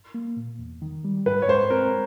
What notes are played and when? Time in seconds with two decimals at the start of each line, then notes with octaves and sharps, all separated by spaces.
0.14 A#3
0.37 A#2
0.59 E2
0.82 D#3
1.04 G3
1.26 G#2 B4
1.42 C#5
1.48 G#3 C5
1.70 C4 A#4